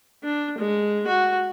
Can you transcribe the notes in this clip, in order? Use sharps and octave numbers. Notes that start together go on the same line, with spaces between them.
D4
G#3
F#4